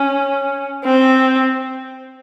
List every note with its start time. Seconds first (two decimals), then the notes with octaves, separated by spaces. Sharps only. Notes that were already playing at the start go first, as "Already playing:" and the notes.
Already playing: C#4
0.84 C4